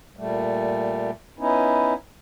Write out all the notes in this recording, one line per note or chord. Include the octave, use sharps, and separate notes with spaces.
A#2 G3 A3
B3 C#4 D#4 E4